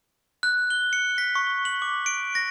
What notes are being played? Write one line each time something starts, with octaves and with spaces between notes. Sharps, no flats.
F#6
G7
C#7
B6
C#6
F#7
D6
D7
A#6